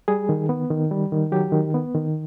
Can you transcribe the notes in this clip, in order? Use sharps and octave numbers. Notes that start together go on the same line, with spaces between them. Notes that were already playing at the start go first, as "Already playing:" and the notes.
G3 G#4
D#3
B3
D#3
G3
D#3
F#3 G4
D#3
B3
D#3